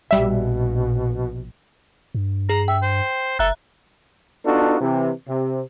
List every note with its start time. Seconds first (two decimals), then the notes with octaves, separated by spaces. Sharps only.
0.11 A#1 B2 G3 E5
2.15 G2
2.49 G#4 A#5
2.68 E5 G5
2.82 C5
3.39 F#1 A4 E5 A#5 F#6
4.45 B3 D4 D#4 F4 F#4 A4
4.81 C3 E3
5.28 C3